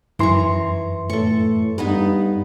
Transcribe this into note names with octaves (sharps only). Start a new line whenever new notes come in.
F#2 E3 A#5 C6 C#6
A2 A4 C#6
G2 B3 D#4 B4